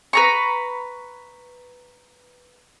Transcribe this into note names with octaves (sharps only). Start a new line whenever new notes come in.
B4 A#5 C#6